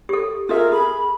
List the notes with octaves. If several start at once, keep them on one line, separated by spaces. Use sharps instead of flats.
G4 A4
F4 G#4 A#4 E5
G#4 B5